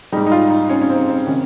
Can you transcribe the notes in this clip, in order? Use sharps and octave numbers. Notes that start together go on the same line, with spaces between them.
G#2 G3 D#4
D#4
F4
D#4
C#4
C#4
C4
C4
C3 D#3 C#4